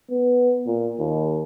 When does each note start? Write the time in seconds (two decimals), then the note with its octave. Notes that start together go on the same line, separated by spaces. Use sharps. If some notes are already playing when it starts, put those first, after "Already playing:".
0.10 B3
0.66 A#2
0.99 D#2